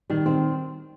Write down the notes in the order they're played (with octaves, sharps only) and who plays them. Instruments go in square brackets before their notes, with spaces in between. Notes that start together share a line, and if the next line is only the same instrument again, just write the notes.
[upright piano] D#3 [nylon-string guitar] G3
[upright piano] D#3 [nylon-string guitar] C4